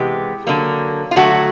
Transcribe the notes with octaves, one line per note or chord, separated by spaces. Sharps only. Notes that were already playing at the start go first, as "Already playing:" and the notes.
Already playing: C3 E3 G#3 B3 G4
D3 F#3 A#3
F4
D3 F#3 A3 F#4